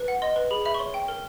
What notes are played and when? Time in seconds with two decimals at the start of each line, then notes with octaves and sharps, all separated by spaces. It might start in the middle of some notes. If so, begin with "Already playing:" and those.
Already playing: B4
0.08 F#5
0.22 D#5 C6
0.36 B4
0.51 G#4 B5
0.65 E5 B5
0.74 C#6
0.79 C#5 C6
0.94 G5
1.08 A#4